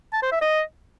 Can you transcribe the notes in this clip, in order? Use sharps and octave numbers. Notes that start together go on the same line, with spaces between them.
A5
C5
E5
D#5